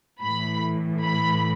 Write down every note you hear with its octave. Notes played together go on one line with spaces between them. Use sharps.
A2 E3 B5
B5